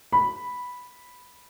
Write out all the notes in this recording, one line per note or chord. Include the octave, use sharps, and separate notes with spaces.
B5